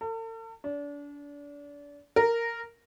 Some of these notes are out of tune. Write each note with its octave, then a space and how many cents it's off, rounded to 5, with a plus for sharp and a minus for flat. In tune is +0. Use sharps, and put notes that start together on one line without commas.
A4 +45
D4 -30
A#4 -10